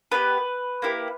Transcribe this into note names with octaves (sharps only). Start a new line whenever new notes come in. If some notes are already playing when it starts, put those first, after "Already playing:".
B3 D4 G4 B4
A#3 E4 G4